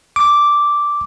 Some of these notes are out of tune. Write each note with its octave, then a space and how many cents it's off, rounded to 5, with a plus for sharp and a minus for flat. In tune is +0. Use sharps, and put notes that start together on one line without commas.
D6 -5